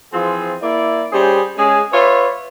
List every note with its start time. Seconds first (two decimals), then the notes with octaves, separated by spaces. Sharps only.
0.13 E3 F3 C4 F4 G#4
0.63 A#3 E4 D5
1.13 G3 C#4 G#4 C5
1.58 G#3 C#4 G#4
1.93 F4 B4 C#5 D5 E5